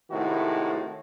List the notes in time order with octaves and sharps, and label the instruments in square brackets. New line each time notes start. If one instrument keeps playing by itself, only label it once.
[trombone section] A2 C3 D#3 G#3 E4 F#4